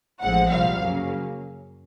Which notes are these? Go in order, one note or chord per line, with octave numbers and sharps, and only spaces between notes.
A1 A2 F3 G#3 C4 F#5
C2 A#2 G3 F5
F#2 C#3 F#3 A#3 C#4